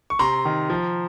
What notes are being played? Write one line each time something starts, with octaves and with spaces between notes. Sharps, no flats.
C#6
C3 A#5 C6
D#3
F3